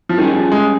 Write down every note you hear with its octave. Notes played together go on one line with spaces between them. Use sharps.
F3
D#3 G3 C#4 G#4
F3
G#3